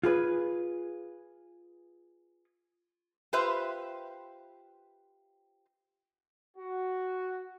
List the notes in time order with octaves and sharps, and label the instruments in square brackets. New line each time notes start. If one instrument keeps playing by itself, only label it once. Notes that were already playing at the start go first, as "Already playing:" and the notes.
[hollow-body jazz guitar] F4 G#4 B4
[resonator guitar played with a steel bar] F4 G4 B4 C5 E5
[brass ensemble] F#4